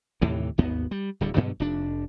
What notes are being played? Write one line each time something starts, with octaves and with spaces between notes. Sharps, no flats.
D#2 A2 C3 E3
G#1 D#2 B3
G3
D1 D3 G3
G2 B2 D3 F#3
F1 D4